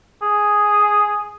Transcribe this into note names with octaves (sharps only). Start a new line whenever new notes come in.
G#4